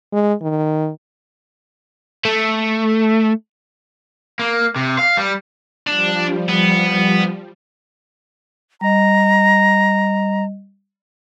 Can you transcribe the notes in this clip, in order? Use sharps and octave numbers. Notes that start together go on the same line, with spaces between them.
G#3
D#3
A3
A#3
C3
F5
G3
F3 G3 D4
B3
G3 D#5 A#5